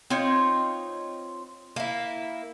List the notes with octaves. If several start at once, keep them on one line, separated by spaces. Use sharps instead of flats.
C4 D#4 F4 C#5
A#3 E4